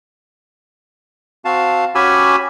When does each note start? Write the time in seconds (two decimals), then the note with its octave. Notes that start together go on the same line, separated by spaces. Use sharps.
1.45 C4 F#4 F5 A5
1.95 C#4 F#4 G4 G#5 B5 E6